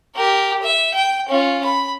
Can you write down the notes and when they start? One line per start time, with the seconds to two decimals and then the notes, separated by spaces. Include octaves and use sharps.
0.15 G4 A#4
0.62 E5
0.94 G5
1.29 C#4 F4
1.65 B5